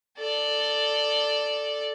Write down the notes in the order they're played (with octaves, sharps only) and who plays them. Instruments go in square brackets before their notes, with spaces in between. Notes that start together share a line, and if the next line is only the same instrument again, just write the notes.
[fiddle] A4 D5